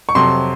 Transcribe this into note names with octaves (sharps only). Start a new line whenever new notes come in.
C#6
F2 C3 F#3 C6